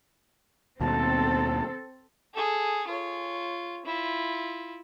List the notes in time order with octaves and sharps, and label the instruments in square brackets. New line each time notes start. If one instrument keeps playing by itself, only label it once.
[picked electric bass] D#2 B2 [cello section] C4 A4 [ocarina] A5
[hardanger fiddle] G#4 A4
F4 C#5
E4 F4